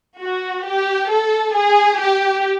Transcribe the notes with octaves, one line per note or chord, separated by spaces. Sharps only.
F#4
G4
A4
G#4
G4